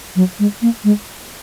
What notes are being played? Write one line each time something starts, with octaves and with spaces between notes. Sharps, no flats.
F#3
G#3
A#3
G#3